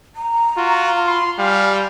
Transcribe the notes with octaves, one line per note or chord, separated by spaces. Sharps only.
A#5
F4 F#4
B5 C6
G3 F5 G#5